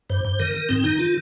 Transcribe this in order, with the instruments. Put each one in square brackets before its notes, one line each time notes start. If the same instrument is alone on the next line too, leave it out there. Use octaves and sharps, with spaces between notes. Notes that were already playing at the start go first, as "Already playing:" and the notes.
[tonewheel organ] G2 C5
G2
D#3 A#4
D#3
G#2 C4
D#3 D#4
D#3 F4